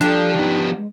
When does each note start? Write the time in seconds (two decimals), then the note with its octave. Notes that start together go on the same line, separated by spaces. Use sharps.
0.01 F3 G3 A#3 D4 G4 A4
0.36 F3 B3 D#4
0.77 G#3